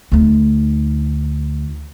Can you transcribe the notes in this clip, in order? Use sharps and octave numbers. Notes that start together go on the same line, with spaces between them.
D2 D#4